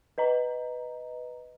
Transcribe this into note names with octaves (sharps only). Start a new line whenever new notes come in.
B4 D#5 A#5